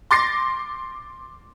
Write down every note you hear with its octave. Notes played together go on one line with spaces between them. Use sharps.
C6 D6 A6 A#6 C7